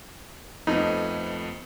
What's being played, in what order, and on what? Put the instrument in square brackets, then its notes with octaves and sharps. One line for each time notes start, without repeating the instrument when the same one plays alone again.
[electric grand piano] F2 A3 B3 [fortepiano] D#4